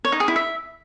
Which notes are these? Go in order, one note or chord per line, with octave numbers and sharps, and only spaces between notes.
C#5
D#4
G#4
E4
E5